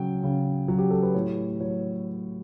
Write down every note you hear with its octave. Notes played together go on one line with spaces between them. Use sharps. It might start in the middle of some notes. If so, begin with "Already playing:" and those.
Already playing: C#3 F#3 G5
C#3
F#3
G4
A4
B4
A2 C#5
F#3 C#5